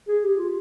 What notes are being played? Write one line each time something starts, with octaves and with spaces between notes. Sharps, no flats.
G#4
G4
F4